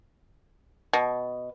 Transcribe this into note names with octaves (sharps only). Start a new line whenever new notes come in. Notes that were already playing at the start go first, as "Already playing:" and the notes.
B2